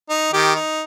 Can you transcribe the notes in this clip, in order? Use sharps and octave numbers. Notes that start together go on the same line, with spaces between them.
D#4
D#3 G4
D#4